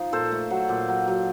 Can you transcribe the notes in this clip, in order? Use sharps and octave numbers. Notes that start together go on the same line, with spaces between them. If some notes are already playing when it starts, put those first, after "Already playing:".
Already playing: F3 D#4
A#2 A4 C5
A3
F#3
A#2
F#3
F#3